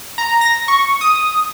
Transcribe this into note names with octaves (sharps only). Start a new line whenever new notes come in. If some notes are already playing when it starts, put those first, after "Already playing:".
A#5
A#6
C#6
D#6